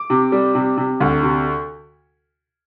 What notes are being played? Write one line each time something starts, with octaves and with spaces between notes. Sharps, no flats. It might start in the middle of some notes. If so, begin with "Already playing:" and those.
Already playing: D6
C3
G3
C3
C3
D2
C3